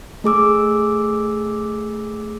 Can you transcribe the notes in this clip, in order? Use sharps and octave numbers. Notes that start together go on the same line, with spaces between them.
A3 G#4 D6 E6